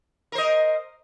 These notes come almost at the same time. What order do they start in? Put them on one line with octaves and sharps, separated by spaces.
A#4 C5 D#5